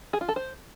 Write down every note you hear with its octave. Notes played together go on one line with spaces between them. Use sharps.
G#4
F4
A4
C5